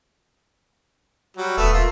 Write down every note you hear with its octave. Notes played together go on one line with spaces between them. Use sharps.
F#3 G3
D#1 A3 B3
A3 A#3 F4